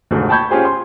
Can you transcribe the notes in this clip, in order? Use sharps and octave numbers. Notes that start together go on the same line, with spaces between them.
F1 D2 G#2 D3
G5 A5 B5 C#6 G6 G#6
C#4 F4 G4 G#4 C5
C6